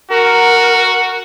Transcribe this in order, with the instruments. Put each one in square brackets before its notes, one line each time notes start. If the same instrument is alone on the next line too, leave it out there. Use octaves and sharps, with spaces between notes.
[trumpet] F#4 [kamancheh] A#4